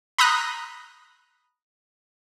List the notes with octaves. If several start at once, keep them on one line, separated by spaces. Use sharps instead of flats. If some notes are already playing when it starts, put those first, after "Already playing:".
A#5 B5 D#6 F#6 A#6